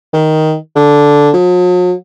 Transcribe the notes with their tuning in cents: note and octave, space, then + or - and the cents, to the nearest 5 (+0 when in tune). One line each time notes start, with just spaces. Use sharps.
D#3 +5
D3 -5
F#3 -45